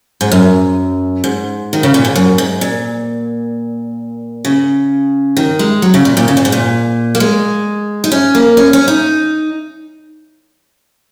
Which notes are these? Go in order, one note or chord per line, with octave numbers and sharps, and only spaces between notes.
G#2
F#2
G#2
D#3
C#3
A#2
G#2
F#2
G#2
A#2
C#3
D#3
G#3
F#3
C#3
A#2
A#2
C#3
A#2
G#2
A#2
A#3
G#3
D#4
C#4
A#3
C#4
C#4
D#4